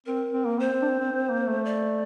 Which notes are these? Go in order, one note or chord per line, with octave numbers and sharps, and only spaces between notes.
C4 A#4
C4
A#3
C4 C5
C4
D4
C4
C4
C4
A#3
A3
D5